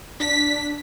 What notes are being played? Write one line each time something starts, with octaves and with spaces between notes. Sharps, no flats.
D4 B6